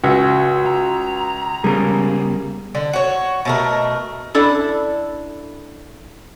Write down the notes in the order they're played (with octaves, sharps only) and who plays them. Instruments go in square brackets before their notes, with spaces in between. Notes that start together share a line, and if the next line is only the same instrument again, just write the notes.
[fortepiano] C#2 [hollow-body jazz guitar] F#4
[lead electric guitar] A#5
[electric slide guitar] C#3 G3 [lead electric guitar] G#3 B3 [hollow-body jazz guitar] G#4 A#4
[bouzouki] D3
F#4 C#5
B2 A3 A#4
[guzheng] D4 E4 A4